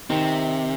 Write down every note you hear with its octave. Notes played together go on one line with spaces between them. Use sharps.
C3 D#3